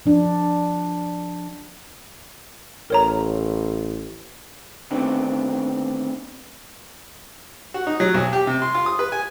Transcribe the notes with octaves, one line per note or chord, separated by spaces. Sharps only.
F3 D4
A1 A#4 C#5 A#5
A2 D3 D#3 B3 C4
F#4
D#4
F#3
B1
G4
C3
C6
F4
D#6
B4
G#5